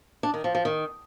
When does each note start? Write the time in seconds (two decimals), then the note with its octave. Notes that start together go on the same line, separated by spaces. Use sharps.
0.23 D4
0.34 D#3
0.44 F3
0.55 F3
0.65 D#3